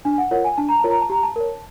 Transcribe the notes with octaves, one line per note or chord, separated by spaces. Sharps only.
D4 G#5
F#5
F4 A#4 C#5 F#5
G#5
D4 A5
A#5
F4 A#4 C#5 A5
A#5
A5
G4 A#5
A5
A#4 C#5